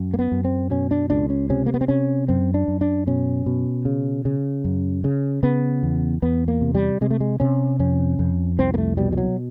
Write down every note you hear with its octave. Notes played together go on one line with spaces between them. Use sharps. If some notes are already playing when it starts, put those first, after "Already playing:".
Already playing: F#2
A#3
B3
F#2
C4
B2 C#4
D4
C#2 D4
C#4
C3 C#4
A#3
B3
C4
C3 C#4
F#2 C4
D4
F#2
D4
B2 C#4
B2
C#3
C#3
F#2
C#3
C#3 B3
E2
E2 B3
A#3
C3
G3
C3 G#3
A3
G#3
C3 C#4
F2 C#4
F2
C2 C4
A#3
A3
B2 G3
G3
F#3